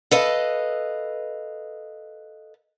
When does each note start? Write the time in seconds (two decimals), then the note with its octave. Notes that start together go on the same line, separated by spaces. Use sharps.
0.11 A4 B4 D#5 F5